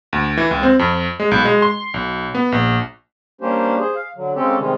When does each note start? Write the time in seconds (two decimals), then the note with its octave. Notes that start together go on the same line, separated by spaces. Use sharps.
0.13 D2
0.37 E3
0.51 C#2
0.63 C4
0.79 F2
1.20 G#3
1.31 B1
1.45 G#3
1.62 C6
1.94 B1
2.35 B3
2.52 A#1
3.41 G3 A#3 C#4 D4 G4 C5
3.79 G#4 C5
3.95 F5
4.16 D3 F#3
4.36 C#3 G#3 C4 C#4 G4 A4
4.57 C3 D#3 G3 G#3